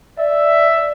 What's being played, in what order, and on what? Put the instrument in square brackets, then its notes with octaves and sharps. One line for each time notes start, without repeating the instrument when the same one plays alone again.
[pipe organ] D5 [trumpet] E5